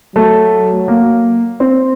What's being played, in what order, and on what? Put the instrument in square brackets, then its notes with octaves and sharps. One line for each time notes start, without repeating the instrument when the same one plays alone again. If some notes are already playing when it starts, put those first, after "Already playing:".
[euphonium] F#3 [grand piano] A3
[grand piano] A#3
C4